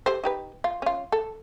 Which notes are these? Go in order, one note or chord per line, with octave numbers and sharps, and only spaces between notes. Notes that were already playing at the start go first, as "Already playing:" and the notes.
G4 A4 C5
D#4 G4 B4
F4
C#4 F4
A4